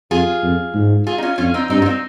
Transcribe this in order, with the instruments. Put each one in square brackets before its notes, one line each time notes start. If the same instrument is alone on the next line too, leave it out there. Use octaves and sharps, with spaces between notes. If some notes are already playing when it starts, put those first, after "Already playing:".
[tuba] F2 [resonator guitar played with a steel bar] F4 G#4
[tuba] F2
G#2
[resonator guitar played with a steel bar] F4 G#4
D#4
C#4 F4
[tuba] F2 [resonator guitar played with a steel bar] C#4 F4
[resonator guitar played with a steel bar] C4 D#4
[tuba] G2 [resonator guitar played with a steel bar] C4 D#4
[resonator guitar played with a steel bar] F4
C4 D#4